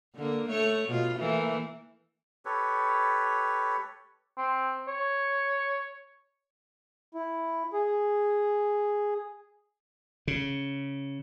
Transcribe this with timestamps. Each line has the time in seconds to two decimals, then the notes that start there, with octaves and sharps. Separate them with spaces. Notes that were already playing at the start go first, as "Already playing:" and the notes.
0.15 D3 A#3
0.49 A3 C#5
0.88 B2 F4
1.19 E3 A3 A#3
2.45 G4 A4 B4 C#5
4.37 C4
4.88 C#5
7.15 E4
7.73 G#4
10.27 C#3